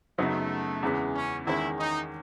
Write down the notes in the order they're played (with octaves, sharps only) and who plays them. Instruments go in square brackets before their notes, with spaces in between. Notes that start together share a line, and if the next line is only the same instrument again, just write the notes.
[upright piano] F#2 C#3 F#3 B3 D#4 [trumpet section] A3
[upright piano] E2 C#3 E3 G#3 B3
[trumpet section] C#4
[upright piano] E2 D#3 G#3 C#4 [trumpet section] E4
[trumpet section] D#4